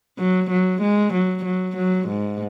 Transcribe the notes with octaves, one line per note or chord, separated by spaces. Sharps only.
F#3
F#3
G#3
F#3
F#3
F#3
G#2